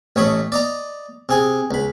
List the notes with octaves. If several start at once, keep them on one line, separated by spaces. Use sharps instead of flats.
A1 A3 C#5 D#5 B5
D5 D#5 A#5
C3 G#4 G#5
C#2 B5